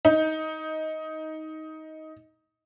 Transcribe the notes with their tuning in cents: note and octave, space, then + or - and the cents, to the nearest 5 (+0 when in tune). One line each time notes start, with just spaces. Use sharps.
D#4 +15